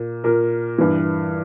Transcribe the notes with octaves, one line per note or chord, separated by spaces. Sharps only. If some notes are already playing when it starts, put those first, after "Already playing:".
Already playing: A#2
A#2 A#4
G2 E3